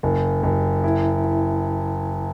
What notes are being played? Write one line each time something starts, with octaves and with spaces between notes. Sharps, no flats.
F#1
F#1
E4
E4